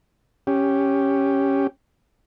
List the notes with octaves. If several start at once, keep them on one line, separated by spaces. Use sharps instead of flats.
C#4 G4